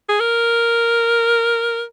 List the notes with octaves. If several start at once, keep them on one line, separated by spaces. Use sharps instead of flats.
G#4
A#4